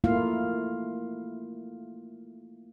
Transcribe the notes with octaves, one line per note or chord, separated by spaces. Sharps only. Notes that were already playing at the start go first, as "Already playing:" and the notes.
A3 A#3 E4 F4 F5